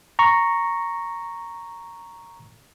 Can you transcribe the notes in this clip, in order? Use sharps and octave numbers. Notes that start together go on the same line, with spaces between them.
A#5 C#6